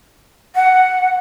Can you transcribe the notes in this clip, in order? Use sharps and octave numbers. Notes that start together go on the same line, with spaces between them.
F#5